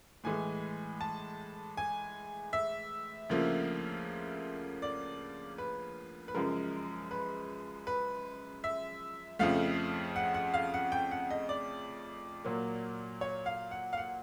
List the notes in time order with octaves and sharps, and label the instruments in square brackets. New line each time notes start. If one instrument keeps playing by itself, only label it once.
[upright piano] A2 E3 G#3 G#5
A5
G#5
E5
D2 C#3 F3 A#3
D5
B4
B4
F#2 C#3 F3 G#3 A#4
B4
B4
E5
F2 C#3 F3 A3 F5
F#5
F#5
F5
F#5
G5
F#5
D#5
D5
A#2 F#3 A#3
C#5
F5
F#5
F5
F#5